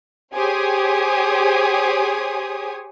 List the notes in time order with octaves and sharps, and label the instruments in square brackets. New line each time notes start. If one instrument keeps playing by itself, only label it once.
[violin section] G4 G#4 C5 C#5 G#5 D#6